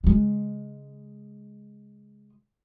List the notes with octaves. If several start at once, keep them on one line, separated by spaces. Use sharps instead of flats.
C#3 G#3